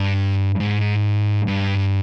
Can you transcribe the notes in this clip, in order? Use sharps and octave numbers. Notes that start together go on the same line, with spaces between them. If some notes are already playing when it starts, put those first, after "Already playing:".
Already playing: G2
G#2
G2